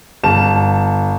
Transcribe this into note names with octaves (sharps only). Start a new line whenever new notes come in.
G1 A5 E7